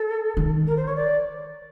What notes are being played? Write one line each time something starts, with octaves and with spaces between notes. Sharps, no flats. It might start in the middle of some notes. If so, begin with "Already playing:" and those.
Already playing: A4
D#3
A#4
C5
C#5
D5